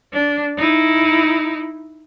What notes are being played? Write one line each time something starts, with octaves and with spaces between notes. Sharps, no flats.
D4
D#4 E4